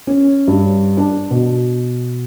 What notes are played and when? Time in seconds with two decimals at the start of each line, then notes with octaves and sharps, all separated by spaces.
0.07 C#4
0.48 G2
0.97 D4
1.31 B2